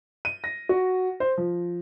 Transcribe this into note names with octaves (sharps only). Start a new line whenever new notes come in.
D#7
A#6
F#4
C5
F3